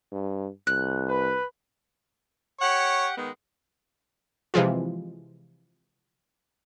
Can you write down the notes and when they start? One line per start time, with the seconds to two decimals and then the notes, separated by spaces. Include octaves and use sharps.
0.12 G2
0.67 C2 F#6
1.09 B4
2.61 G4 C#5 F#5
3.16 D#3 G#3 B3
4.54 C3 E3 F3 G#3 F4